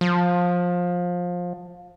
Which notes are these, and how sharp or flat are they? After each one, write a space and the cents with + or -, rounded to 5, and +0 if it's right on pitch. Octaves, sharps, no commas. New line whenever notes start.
F3 +20